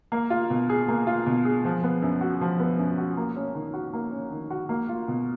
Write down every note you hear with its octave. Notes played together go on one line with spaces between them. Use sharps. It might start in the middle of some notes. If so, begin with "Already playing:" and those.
A#3
F4
B2
G#4
A#3
F4
B2
G#4
F3
B3
F#2
F#4
F3
B3
F#2
F#4
A#3
C#4
D#3
F#4
A#3
C#4
D#3
F#4
A#3
F4
B2